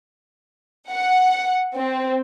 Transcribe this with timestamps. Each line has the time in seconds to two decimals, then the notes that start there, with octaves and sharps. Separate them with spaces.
0.91 F#5
1.74 C4